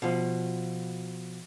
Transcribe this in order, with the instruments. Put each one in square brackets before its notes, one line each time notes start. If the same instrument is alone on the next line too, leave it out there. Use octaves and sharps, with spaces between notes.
[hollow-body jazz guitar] B2 F3